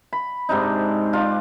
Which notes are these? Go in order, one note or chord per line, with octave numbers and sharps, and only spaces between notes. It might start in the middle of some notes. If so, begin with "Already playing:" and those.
B5
G#2 C3 D4 D#4
D4 F4